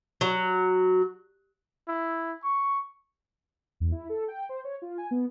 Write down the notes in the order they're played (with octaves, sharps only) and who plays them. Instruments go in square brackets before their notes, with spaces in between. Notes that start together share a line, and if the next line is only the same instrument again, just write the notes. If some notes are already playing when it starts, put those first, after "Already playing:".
[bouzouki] F#3
[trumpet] E4
C#6
[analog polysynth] E2
E4
A4
G5
C5
C#5
F4
G#5
B3